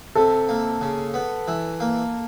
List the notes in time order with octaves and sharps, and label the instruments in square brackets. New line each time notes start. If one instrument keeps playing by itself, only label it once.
[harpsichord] C3 [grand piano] A4
[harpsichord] A#3
C#3
B3
E3
A#3